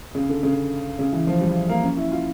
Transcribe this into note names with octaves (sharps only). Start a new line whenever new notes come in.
C#3
D3
C#3
C#3
E3
F3
G3
A#3
C#4
E4
F4